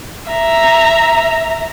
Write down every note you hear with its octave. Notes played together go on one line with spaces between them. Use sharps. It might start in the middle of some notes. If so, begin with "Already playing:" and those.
E5 A#5